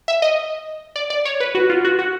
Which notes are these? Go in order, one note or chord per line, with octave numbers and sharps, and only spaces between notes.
E5
D#5
D5
D5
C#5
B4
F#4
F4
F#4
F#4